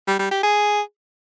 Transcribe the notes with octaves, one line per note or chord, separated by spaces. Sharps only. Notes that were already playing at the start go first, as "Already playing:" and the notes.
G3
G3
G4
G#4